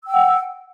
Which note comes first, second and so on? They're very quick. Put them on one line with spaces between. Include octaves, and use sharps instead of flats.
E6 G5 F#5